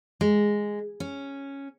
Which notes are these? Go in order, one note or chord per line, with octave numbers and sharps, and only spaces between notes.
G#3
C#4